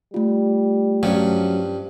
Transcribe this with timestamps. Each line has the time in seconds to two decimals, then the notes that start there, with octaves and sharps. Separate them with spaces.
0.14 G3 A3 F4
1.03 G2 F3 F#3 C#4